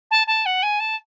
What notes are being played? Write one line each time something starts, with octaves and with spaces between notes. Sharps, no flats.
A5
A5
F#5
G#5
A5